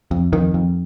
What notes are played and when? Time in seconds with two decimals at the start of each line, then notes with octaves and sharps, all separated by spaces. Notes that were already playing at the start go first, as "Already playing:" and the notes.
0.11 F2
0.32 F2 D#3
0.54 F2